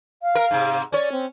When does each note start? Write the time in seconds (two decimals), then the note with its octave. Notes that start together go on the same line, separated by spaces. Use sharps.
0.23 F5
0.35 A#4
0.51 G#2 C3
0.92 C#4 C#5 D5
1.12 C4